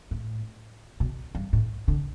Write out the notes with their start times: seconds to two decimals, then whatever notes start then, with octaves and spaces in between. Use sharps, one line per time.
0.11 A2
1.00 B2
1.35 G2
1.53 A2
1.88 D3